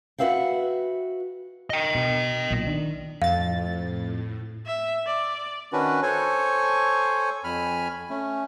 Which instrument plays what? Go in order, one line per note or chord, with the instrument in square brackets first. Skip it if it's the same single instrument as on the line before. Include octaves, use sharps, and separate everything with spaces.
[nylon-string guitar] F#4 G#4 B4 E5 F5 G5
[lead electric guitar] D#5 G5
[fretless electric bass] B2
B1 A#2
D#3 D4
[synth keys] F2 A6 [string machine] A2 [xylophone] F5
[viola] E5
D5
[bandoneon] D#3 C#4 D4 F#4 B4
A4 C5 C#5 G#5 C#6
F2 G#5 B5 F6
A3 C#4